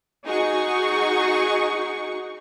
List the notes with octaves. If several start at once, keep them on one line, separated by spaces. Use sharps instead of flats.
D#4 F#4 G#4 C#6